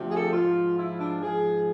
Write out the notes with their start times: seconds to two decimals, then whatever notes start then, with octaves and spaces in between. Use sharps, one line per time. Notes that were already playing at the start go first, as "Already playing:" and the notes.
Already playing: D2 C3 F3
0.10 G#4
0.16 A4
0.31 G#2 F3 F4
0.76 E4
0.99 D4
1.21 G#2 F3 G#4